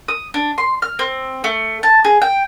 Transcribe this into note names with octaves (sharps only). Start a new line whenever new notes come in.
D#6
D4
C6
F6
C4
A3
A5
G#4
G5